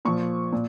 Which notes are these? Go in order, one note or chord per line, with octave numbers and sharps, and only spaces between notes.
A#2 F3 C#6
A#2